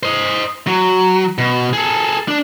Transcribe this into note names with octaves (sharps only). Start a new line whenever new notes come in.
C5 D#5
F#3
B2
G#4 A4
D4